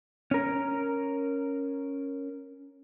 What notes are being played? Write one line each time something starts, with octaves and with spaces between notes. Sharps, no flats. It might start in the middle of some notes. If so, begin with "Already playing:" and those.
C#4 A#4